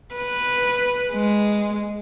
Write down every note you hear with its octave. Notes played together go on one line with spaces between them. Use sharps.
B4
G#3